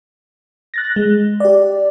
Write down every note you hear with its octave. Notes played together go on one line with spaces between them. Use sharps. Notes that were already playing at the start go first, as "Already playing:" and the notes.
F#6 A6 A#6
G#3
G4 D5